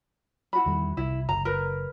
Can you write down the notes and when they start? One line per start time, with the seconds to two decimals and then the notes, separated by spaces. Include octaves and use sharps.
0.53 E4 F#4 B5
0.66 E2 D#3 G3
0.97 C2 E4
1.29 F#1 A#5
1.45 A#4 B4